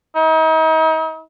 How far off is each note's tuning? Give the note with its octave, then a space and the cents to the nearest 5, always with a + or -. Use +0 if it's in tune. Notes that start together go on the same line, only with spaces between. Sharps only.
D#4 +40